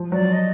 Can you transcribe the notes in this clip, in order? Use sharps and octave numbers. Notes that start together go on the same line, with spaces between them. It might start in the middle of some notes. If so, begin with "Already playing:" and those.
Already playing: F3
F#3 D5
D#5